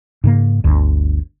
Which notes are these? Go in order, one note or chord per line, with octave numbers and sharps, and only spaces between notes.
G#2 C#3 A#3
G1 D2 D3